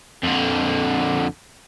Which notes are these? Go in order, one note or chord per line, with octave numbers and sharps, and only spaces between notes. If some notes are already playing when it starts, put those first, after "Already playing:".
F2 D3